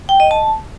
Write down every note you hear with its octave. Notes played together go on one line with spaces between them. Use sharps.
G5
D#5
A5